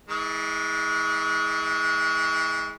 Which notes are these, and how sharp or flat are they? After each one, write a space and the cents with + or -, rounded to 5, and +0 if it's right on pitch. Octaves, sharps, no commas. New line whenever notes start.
E3 -35 G#3 +0